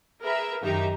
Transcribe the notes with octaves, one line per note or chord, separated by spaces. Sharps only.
G#4 A#4 B4 E5
F#2 D#3 D#4 G4 E5 A#5